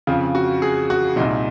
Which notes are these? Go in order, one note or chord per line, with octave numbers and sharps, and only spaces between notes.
F2 C#3 F4
F#4
G#4
F#4
C2 A#2 D#4